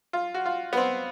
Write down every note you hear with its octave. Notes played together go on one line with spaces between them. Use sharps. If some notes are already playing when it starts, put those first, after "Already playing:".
F4
F#4
F4
B3
C4